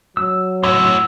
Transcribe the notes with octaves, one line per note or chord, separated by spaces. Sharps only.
F#3 E6
A2 F#4 C#5 B5 C6 E6